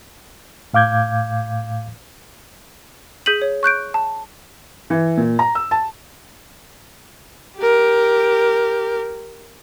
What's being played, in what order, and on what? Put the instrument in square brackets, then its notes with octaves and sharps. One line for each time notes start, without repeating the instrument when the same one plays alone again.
[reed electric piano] A2 F5 D6 G6 G#6
[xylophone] G#4 G6 B6 D#7 F#7
C#5
C#6 F#6 G6 D7
A5
[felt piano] E3
A#2
A#5
E6
A5
[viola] G4 A#4